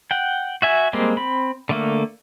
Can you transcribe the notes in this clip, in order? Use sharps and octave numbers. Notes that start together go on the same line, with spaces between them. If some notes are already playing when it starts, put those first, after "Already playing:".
F#5 G5
F#4 E5 G#5
G3 G#3 A#3 C4
C4 B5
D3 A3 A#3